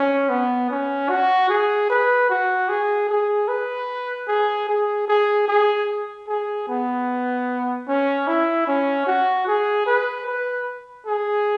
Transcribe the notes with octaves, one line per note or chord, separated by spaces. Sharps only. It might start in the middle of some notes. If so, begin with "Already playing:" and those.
Already playing: C#4
B3
C#4
F#4
G#4
B4
F#4
G#4
G#4
B4
G#4
G#4
G#4
G#4
G#4
B3
C#4
E4
C#4
F#4
G#4
B4
B4
G#4